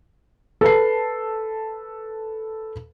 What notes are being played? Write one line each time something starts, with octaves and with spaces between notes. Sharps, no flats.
A4 B4 A5 C7